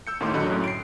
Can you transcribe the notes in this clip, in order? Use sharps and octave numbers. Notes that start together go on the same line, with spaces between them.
E6 G6 C#7
D#2 A2 A#3 D#4 C6 D6
A1 D3 F#3 D#5 B5 F#6
F#2 A2
C7 D7